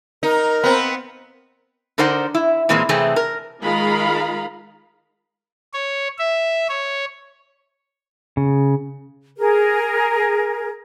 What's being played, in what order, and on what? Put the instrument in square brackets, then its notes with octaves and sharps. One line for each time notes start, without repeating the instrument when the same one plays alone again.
[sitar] D#4 [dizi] A#4
[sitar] B3 C4
[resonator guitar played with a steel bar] D3 D#4 A#4 C5 D5 F#5
E4
A#2 E3 G#3 A#3 C4
C3 E3 A3 C4 G#4
A#4
[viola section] D#3 G#3 F4 F5 A#5 B5
[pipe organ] C#5
E5
C#5
[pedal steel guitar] C#3
[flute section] G#4 A#4